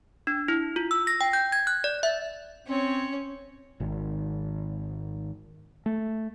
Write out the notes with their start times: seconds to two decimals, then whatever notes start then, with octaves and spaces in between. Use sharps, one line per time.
0.27 D4
0.48 E4
0.76 F4
0.91 E6
1.07 A#6
1.21 G5
1.33 G6
1.52 G#6
1.67 F#6
1.84 D5
2.03 E5
2.67 C4 C#4 C#5
3.80 G#1 D#3
5.86 A3